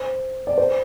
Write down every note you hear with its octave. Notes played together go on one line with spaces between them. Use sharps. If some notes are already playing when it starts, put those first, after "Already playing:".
Already playing: C5
D5
C5